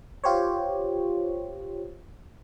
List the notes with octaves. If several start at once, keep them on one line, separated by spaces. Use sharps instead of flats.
F4 G4 C5 C#5